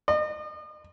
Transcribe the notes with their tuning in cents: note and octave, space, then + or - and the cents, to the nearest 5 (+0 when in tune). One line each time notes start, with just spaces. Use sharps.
D#5 -40